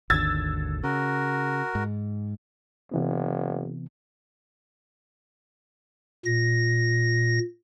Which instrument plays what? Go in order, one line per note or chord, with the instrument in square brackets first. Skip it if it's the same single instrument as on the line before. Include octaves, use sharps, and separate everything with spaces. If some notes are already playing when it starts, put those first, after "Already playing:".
[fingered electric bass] G#1 D#2 D3 [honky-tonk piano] E6 G#6 A6
[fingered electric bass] C#3 [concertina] F#4 A#4
[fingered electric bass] G#2
[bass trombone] F#1 [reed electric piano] C3 E3 B3
[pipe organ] A#2 A#6